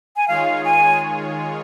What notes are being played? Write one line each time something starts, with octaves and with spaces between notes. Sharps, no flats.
G#5
D#3 G#3 F4 G#4 C#5 F5
G#5